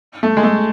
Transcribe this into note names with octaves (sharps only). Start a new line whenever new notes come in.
A3
G#3
A3